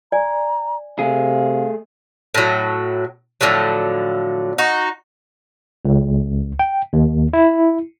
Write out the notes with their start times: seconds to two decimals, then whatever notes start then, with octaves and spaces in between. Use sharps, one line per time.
0.12 D5 G#5 A#5
0.99 C3 A3 G#4 F5
2.34 A2 F#3
3.41 A2 D3 F3 F#3
4.58 D#4 F#4
5.85 C#2
6.59 G5
6.93 D#2
7.33 E4